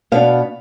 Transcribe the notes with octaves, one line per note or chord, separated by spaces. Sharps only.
B2 B3 D4 F5